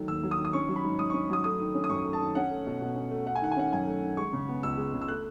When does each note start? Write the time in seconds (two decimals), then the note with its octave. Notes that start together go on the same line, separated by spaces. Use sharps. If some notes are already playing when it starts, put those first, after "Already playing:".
Already playing: D#3 F#3 A3
0.08 D#2 E6
0.23 F#3
0.31 D#6
0.38 D#3
0.45 D#6
0.53 C#4 C#6
0.68 F#3
0.76 B5
0.84 G#2
0.99 G#2 D#6
1.10 C#4 C#6
1.30 F#3 D#6
1.44 A3 D#6
1.60 D#3
1.74 C#4
1.84 D#6
1.89 F#2 C#6
2.05 A3
2.13 A5
2.21 D#3
2.35 C#4 F#5
2.51 A3
2.67 B2
2.81 B2
2.96 C#4
3.11 A3
3.26 A3 F#5
3.35 G#5
3.42 D#3 F#5
3.51 G#5
3.57 C#4 F#5
3.73 F#2 G#5
3.87 A3
4.03 D#3
4.17 G#3 C#6
4.33 C#3
4.48 B3
4.63 C#2 E6
4.78 G#3
4.94 C#3
5.01 E6
5.08 A3 F#6